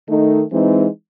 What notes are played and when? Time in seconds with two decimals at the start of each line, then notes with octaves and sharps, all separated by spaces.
0.09 D#3 A3 D#4 A4
0.52 E3 G#3 C4 D#4